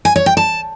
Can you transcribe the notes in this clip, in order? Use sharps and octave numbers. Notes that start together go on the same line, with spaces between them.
G#5
C#5
G5
A5